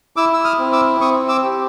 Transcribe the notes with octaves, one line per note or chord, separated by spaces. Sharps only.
E4 D6 E6
E6
D#6 F6
C4
D6 E6
C4 C#6 D#6
D6 E6
G4